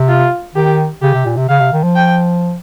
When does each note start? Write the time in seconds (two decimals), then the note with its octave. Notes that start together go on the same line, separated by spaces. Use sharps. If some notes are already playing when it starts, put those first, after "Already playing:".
Already playing: C3
0.08 F4
0.55 D#3 G4
1.02 C#3 G4
1.14 C3
1.25 A#2
1.37 C3
1.49 C#3 F5
1.61 C3
1.73 D#3
1.83 F3
1.96 G5